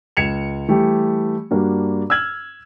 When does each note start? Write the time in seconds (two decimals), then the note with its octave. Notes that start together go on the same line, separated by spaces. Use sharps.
0.17 C#2 G#6 C#7 E7 F7
0.68 E3 G3 A3 G4
1.51 G2 A#3 D4 F#4
2.10 E6 F6 G#6 F#7